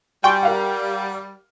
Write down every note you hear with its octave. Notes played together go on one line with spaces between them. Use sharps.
G3 G5 G#5 C6 C#6
A#4 F5 F#5